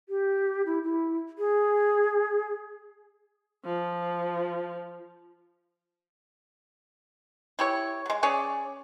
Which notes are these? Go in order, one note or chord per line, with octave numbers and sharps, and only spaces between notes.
G4
E4
E4
G#4
F3
E4 G4 C#5
F#3 G#3
C#4 G#4 C#5 D5